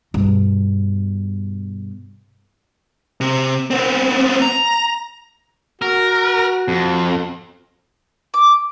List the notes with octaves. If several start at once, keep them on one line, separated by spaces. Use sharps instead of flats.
G2 B2
C3
B3 C4
A#5
F#4 A#4
F2
D6